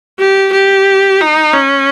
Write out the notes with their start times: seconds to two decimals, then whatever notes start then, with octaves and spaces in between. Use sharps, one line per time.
0.19 G4
0.52 G4
1.21 D#4
1.54 C#4